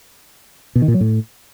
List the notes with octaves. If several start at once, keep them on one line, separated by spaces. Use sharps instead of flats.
B2
D#3
A#2
F#3
A2